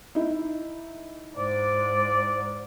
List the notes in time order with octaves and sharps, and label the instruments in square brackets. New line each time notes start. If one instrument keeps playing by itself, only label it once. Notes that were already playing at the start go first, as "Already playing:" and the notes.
[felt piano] D#4 E4
[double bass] G#2 [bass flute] C5 [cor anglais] D5